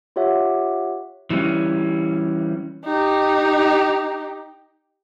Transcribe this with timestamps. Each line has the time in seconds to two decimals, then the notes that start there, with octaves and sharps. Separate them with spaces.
0.16 F4 G4 C#5 E5 F#5
1.30 E3 G3 B3 C#4
2.85 D#4 G4